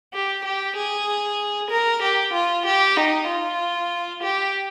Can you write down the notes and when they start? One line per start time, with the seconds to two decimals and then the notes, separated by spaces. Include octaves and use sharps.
0.13 G4
0.44 G4
0.76 G#4
1.70 A#4
2.02 G4
2.33 F4
2.66 G4
2.97 D#4
3.28 F4
4.23 G4